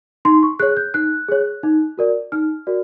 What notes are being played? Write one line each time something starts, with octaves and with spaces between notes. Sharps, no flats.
D#4 C6
C#6
G#4 C#5 F#6
G6
D#4 F#6
G#4 C#5
D#4
F#4 A#4 D5
D#4 F6
F#4 A#4 D5